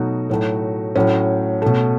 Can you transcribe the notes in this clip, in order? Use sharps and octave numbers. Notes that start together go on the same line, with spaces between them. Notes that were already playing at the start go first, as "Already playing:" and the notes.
Already playing: B2 F#3 A3 D#4 F#4
A2 F#3 A3
A2 F#3 A3 C#4
B2 A3